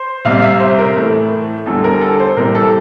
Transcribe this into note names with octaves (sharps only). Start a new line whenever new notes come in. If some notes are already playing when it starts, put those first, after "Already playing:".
Already playing: C5
C2 C3 G3 F5
E5
C5
A#4
A2 E3 A3
E2 D3 G3 A4
A#4
A4
C5
C2 C3 E3 G3 A#4
A4